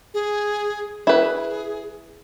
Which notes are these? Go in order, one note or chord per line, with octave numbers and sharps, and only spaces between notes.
G#4
E4 G#4 B4